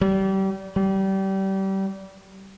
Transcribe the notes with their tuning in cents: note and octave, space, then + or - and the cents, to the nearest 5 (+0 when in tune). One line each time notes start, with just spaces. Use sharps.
G3 -30
G3 -25